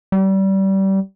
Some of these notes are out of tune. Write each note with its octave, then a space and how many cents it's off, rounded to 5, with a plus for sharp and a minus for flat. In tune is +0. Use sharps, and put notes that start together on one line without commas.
G3 -25